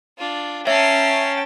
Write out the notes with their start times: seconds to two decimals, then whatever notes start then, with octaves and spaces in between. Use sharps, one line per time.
0.18 D4 F4
0.67 C#4 E5 G5 A5 A#5 C7